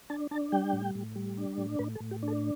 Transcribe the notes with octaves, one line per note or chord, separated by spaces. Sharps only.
D4 A5
D4 A5
G3 G5
A2
A2
G3
D4
A2
A2 B4
A4
A2
G4
D4
A4